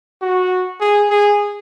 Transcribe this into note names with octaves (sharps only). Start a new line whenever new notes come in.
F#4
G#4
G#4